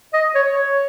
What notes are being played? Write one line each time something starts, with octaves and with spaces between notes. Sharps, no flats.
D#5
C#5
C#5